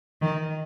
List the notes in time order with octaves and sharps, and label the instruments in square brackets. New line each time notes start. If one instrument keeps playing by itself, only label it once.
[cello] D#3